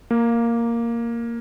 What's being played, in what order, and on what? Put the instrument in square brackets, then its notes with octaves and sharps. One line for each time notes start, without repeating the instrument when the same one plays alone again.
[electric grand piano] A#3